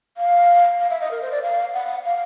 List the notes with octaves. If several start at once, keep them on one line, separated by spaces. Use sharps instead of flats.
F5
F5
E5
D#5
A#4
C5
D5
F5
F#5
F5